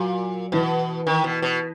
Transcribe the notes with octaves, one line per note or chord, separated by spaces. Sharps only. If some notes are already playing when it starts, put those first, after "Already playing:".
Already playing: A#2 F#3
B2 E3
D#3
B2
B2